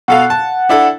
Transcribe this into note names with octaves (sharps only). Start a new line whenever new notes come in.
B2 A4 F5 F#5
A5
D4 E4 A4